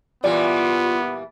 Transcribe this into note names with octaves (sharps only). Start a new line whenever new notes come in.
A#2 E3 G3 B3 F4 D5